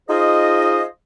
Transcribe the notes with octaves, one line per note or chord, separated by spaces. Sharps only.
D#4 F4 G#4 C5 D#5